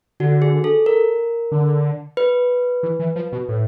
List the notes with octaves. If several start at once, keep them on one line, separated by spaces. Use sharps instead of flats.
D3 F#4
G#4
A4
A#4
D3
B4
E3
E3
F3
B2
A2